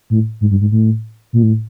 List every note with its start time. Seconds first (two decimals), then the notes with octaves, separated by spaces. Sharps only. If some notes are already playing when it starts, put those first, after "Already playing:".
0.10 A2
0.41 G#2
0.51 G2
0.61 G#2
0.72 A2
1.33 A#2
1.43 A2